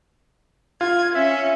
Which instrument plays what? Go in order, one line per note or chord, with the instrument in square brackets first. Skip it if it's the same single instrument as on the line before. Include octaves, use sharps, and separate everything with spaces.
[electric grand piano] F4 [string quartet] G#6
[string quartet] C#4 [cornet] E5